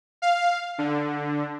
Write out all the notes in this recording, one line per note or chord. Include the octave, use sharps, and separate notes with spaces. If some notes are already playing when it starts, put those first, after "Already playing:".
F5
D3